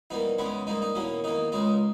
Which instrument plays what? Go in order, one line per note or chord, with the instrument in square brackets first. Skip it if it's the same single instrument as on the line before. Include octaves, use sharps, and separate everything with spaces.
[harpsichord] E2 B2 G3 A#3 D#4
E2 C#3 G#3 B3 C#4
G#2 G3 A#3 D#4
D#4
E2 B2 A#3 C#4
E2 D#3 A#3 D#4
C#2 C#3 G#3 D#4